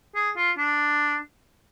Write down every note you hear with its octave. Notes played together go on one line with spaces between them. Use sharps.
G#4
F4
D4